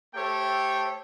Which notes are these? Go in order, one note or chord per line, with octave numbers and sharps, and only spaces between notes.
A3 G4 A4 C5 C#5 G5